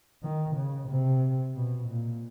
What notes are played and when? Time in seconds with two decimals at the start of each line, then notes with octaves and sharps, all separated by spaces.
0.23 D#3
0.56 C#3
0.88 C3
1.55 B2
1.88 A#2